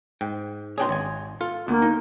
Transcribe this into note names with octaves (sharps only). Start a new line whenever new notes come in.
G#2 G5
B2 D4 G#4 C#5 G5 C6
G#1 G#5
F4 A4
D2 A#3 B3 D4
D#4